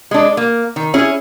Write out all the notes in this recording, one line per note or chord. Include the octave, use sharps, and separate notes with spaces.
G#3 D4
A#3
D#3
C#4 E4 G#4